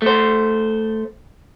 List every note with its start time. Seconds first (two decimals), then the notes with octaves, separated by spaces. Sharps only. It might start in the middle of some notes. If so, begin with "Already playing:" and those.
0.02 A3 C5